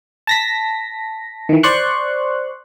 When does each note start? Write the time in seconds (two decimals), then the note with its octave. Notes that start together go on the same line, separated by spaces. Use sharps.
0.27 A5 A#6 B6
1.49 D#3 E3
1.63 C5 D5 C6 C#6 F#6